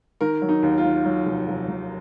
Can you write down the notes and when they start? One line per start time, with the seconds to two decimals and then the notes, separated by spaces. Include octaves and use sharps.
0.21 D#3 A#4
0.42 F#3
0.49 D#4
0.63 D#2
0.78 F4
0.85 D#3
1.06 F#3
1.26 F1
1.48 F1
1.69 F1